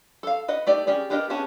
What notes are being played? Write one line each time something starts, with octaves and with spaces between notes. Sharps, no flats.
A4 F5
B4 D#5 F#5
A3 D#4 G4 D5
C#4 G4 G#4 D5
B3 D4 G4 A#4 D#5
B3 C#4 G4 G#4 A5